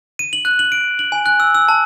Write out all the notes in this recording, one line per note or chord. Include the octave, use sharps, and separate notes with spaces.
D#7
F#7
F#6
F#7
D7
F#7
G#5
F#6
E6
E6
A5